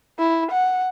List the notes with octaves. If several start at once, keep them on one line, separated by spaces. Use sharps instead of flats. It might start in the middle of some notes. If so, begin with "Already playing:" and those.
E4
F#5